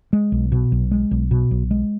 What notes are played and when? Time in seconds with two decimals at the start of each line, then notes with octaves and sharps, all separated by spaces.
0.13 G#3
0.32 B1
0.52 B2
0.72 B1
0.91 G#3
1.11 B1
1.31 B2
1.51 B1
1.71 G#3